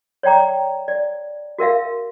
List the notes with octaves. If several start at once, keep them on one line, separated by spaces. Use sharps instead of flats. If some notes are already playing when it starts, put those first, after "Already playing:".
C#5 D5 G5 A#5 D6
D5
F#4 A#4 E5 F5